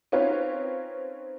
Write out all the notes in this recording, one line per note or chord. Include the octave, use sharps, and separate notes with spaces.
C4 C#4 D#4 F4 B4 C#5